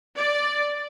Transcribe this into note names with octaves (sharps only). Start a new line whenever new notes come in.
D5